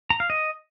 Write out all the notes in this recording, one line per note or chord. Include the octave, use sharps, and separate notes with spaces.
A#5
F5
D#5